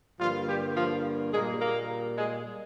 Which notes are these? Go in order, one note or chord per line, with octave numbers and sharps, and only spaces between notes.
G2 D3 F3 G3 A#3 F4
G3 G4
F3 F4
A#2 G3 G#3 A#3 G#4
A#3 A#4
G#3 G#4